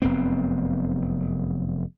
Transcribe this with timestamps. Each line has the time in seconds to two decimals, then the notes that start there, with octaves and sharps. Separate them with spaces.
0.02 F1 F#2 B3 C4